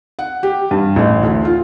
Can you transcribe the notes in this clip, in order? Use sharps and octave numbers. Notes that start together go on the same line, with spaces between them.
F#5
G4
G2
A1
D2
F4